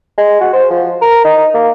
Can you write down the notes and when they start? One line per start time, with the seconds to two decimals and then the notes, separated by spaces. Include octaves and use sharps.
0.17 G#3
0.40 F#4
0.53 C5
0.70 F3
1.01 A#4
1.24 D#4
1.54 A#3